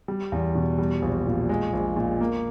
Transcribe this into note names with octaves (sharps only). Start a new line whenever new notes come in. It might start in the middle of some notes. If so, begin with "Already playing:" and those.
G3
E2
B2
G3
A#1
A#2
G#3
A#1
A#2
A#3